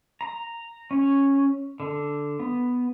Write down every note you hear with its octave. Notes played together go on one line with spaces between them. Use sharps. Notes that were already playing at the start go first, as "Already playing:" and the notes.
A#5
C#4
D3
B3